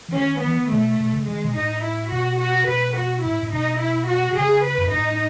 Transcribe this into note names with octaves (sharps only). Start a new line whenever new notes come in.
E3
D#3 C#4
E3 B3
D#3
B2 A3
B2
C#3
D#3 G#3
B2
A2 D#4
E4
B2 F#4
F#4
B2 B4
F#4
A2 E4
A2
B2 D#4
E4
F#4
B2
C#3 G#4
B4
F#2
G#2
A2 D#4